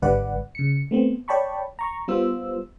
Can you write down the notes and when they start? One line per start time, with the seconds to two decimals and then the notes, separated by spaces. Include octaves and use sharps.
0.02 G#1 D3 G3 B4 D5 F#5
0.55 C#3 C#7
0.91 A3 B3 C4
1.28 C#5 D5 G5 A5 B5 C#6
1.79 A#5 C#6
2.08 G3 B3 F4 C5 E6